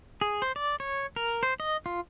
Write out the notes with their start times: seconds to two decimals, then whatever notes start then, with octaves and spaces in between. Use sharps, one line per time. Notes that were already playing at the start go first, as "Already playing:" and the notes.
0.21 G#4
0.42 C5
0.56 D5
0.80 C#5
1.16 A#4
1.43 C5
1.60 D#5
1.86 F4